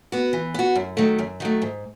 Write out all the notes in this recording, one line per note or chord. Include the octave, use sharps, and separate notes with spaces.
B3 F#4
E3
B3 F#4
F#2
D#3 F#3 A3
F#2
D#3 F#3 A3
G#2